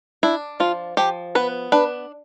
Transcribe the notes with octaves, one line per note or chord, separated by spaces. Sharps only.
D4 E4
F3 F4
F3 G4
B3 B4
D4 B4